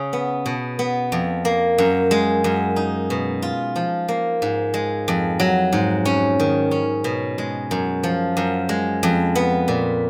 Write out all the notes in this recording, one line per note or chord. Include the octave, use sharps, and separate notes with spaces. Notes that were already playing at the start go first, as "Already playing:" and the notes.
Already playing: C#3 C#4
B3
B2
B3
F2
A#3
F#2
G#3
F#2
D#4
B2
F4
F3
A#3
G#2
G#3
F2
F#3
G#2
C#4
D#3
C#4
B2
G#3
F#2
F3
F#2
G#3
F2
B3
A#2